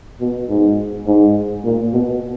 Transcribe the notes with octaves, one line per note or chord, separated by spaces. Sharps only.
B2
G#2
G#2
A#2
B2